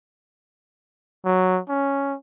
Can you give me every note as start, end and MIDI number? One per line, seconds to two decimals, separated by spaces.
1.25 1.60 54
1.69 2.15 61